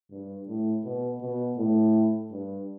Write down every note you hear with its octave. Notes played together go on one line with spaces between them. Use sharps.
G2
A2
B2
B2
A2
G2